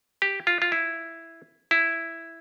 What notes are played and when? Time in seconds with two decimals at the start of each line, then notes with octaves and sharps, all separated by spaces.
0.22 G4
0.47 F4
0.62 F4
0.72 E4
1.71 E4